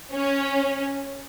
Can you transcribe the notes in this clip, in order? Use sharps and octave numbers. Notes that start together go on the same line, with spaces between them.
C#4